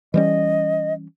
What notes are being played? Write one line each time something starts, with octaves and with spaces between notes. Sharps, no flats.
E3 G3 C#4 D#5